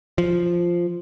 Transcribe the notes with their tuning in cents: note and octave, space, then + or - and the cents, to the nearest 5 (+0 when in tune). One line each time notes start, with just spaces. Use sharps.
F3 -5